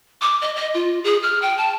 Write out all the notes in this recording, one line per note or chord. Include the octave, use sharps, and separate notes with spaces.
D6
D#5
D#5
F4
G#4
F6
G5
A5